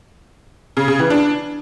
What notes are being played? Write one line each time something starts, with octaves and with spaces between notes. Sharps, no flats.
C#3
C#3
E3
D4